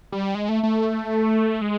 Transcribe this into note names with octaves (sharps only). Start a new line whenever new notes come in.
G3
G#3
A3
A3
G#3